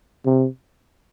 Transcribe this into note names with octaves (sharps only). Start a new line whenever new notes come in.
C3